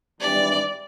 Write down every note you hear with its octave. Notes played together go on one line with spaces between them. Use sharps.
G#1 G2 E3 G3 D5